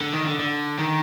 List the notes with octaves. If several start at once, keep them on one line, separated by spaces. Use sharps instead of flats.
D3
D#3
D3
D3
D#3